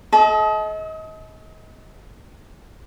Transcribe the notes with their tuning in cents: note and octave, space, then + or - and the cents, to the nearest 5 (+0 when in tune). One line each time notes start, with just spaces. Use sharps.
A4 -40 D#5 +30